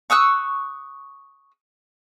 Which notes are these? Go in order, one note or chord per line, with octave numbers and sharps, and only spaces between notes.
C#6 D#6 E6 F#6